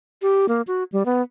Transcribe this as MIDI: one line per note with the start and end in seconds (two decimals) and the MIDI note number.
0.22 0.46 67
0.49 0.62 58
0.67 0.84 66
0.92 1.03 55
1.06 1.22 59